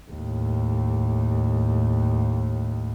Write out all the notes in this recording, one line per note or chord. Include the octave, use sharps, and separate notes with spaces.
D#2 A2